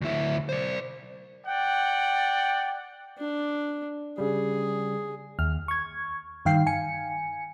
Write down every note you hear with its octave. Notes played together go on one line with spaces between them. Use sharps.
D2 E4
C5 D5
D5 F#5 G5
D4
C#3 G3 G#4
D#2 F6
C#6 G#6
G2 D#3 F5 G5 C7
G#5 C#7